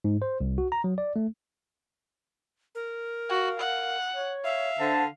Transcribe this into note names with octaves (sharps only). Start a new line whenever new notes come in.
G#2
C5
C2
F#4
A#5
F#3
D5
A3
A#4
F#4 F5
F#5
C#5
E5 F5
D3 C5 A5